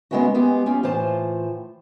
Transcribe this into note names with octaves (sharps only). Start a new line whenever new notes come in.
G#3 A#3 B3 C#4 E4 F#4
G#3 B3 G4
C#4 F4 G4
A2 E3 F4 C5 A5